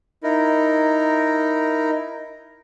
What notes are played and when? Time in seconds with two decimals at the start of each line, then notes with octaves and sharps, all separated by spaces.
0.23 D#4 E4 A#4